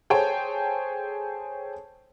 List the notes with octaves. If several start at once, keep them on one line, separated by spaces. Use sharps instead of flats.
G#4 A4 C5 C#5 G5 A5